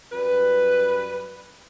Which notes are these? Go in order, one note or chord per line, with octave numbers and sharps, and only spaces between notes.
F#2 G3 B4